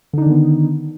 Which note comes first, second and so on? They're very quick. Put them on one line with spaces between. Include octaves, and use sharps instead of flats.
D3 D#4 D4 D#3 B3